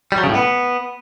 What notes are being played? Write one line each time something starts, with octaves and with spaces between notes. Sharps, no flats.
G3
F#3
C#3
A2
B3